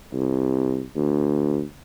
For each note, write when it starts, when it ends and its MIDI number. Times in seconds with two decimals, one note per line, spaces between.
0.13 0.82 36
0.96 1.62 38